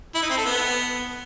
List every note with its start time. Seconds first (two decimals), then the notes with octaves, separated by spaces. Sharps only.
0.15 E4
0.22 D#4
0.30 C4
0.38 A4
0.45 B3